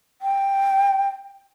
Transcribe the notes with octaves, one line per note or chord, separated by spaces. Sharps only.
G5